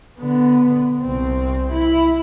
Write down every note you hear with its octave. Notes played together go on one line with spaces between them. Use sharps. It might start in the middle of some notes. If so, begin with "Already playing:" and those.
D3 B3
C2 C4
E4